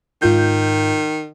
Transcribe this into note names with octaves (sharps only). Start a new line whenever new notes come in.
G#2 D#3 F4 G6